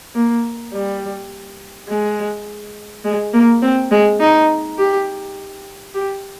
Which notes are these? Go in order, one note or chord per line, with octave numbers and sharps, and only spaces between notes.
A#3
G3
G#3
G#3
A#3
C4
G#3
D#4
G4
G4